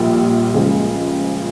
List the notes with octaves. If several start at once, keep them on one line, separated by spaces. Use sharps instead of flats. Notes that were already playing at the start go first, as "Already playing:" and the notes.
Already playing: A#1 A#2 G3
C#2 C#3 F3 G#3